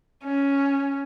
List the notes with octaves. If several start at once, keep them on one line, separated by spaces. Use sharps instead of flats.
C#4